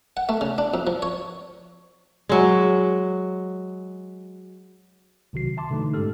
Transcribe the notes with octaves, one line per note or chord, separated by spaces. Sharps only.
F#5
A3
C#3
D4
F2
F3
C#5
F#3 G#3
B1 C3 D#3 F#4 C7
E5 A5 C6 D6
B2 D3 E3 A3 D#4
G#2 G#3 C#4 G4 A4 F6